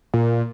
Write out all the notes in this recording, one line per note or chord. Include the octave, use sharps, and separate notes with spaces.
A#2